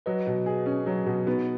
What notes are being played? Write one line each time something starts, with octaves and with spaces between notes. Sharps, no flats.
F#3 B4 D#5
B2
G#4
C#4
F#3
B2
B3 D#4 F#4